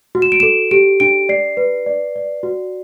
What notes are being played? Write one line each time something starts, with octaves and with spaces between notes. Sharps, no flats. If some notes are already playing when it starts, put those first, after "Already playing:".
F#4
E7
D7
A4 E7
G4 D7
D4 D7
D5 C7
B4
D5
D5
F#4